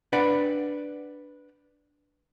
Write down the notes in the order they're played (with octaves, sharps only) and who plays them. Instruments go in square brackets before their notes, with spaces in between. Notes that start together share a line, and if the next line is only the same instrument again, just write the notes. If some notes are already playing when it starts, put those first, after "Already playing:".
[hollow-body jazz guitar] D4 B4 D5 F#5